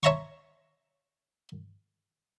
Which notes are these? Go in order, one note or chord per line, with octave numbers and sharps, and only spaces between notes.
C#5 E5 A5 A#5 C6 C#6